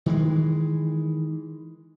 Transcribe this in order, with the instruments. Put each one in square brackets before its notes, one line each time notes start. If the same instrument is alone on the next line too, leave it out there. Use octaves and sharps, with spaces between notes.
[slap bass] D#3 E3 G#3